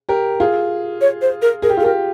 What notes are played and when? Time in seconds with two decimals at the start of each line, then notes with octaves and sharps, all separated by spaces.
0.09 G4 A#4
0.40 F4 G#4
1.01 C#5
1.22 C5
1.42 A#4
1.62 G#4 A#4
1.70 G4
1.77 F4 G#4
1.83 G4 A#4